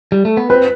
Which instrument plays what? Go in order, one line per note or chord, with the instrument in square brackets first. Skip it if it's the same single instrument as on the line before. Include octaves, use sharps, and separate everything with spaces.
[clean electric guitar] G3
A3
B3
[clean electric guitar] C4 [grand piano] B4